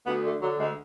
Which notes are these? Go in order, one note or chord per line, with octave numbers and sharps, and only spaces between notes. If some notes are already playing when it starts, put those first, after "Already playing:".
D2 B3
D3 A3
D3 F#3
D2 G#3